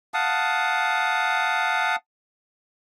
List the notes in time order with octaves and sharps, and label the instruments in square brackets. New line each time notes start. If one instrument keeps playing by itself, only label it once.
[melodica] F5 F#5 A5 D#6